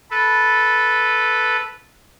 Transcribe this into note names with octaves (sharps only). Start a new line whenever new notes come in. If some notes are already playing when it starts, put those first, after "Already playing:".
A4 B4